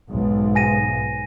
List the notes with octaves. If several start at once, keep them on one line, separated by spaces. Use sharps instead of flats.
B1 G#2
G#5 A#6 D#7